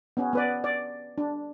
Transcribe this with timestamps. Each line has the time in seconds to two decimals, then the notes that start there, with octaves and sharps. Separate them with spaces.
0.17 B3 C#4
0.33 B3 B4 D5
0.64 D5
1.18 D4